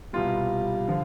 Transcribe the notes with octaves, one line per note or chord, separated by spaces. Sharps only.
C2 B2 G3 F4
D3 F3